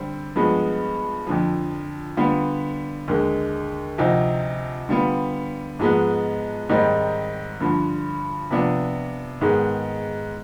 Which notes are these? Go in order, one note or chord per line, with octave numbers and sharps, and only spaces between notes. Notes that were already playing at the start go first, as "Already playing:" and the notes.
Already playing: D3 G3 C4
G2 F3 G#3 B3
F2 D3 F3
D3 G3 B3 F4
D#2 D3 G#3
D2 C3 F3 C4 D#4
D3 G3 B3 F4
G#2 F3 G#3 B3
G#2 D#3 G3 C4 D#4
G2 D3 F3
C3 F3 B3 D4 F4
G#2 D#3 G#3 B3